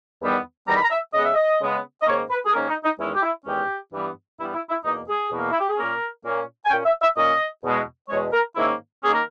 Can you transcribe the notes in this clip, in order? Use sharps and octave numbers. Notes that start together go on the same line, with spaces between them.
E2 D#3 G3 B3
E2 D#3 G3 B3 A#5
B5
A#5
E5
C#3 G#3 B3 D#5
E5
D#5
C#3 G#3 B3
D#5
G#2 D#3 A#3 C#4 C#5
B4
G#4
G#2 D#3 A#3 C#4 A#4
D#4
D#4
E2 D#3 G#3 C#4 E4
G4
E4
E2 D#3 G#3 C#4 G4
G2 E3 G3 B3
G2 E3 G3 B3 E4
E4
E4
E2 B2 A#3 D#4
G#4
E2 B2 A#3
E4
G4
G#4
A#2 A#3 C#4 A#4
A#2 A#3 C#4
G#5
A#2 A#3 C#4 G5
E5
E5
A#2 A#3 C#4 D#5
E2 B2 G#3
E2 B2 G#3 C#5
A#4
G#2 D#3 A#3 C#4 E4
D#3 A#3 C#4 G#4
A#4